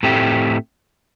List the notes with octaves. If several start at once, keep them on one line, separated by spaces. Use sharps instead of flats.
A2 A3 C4 G4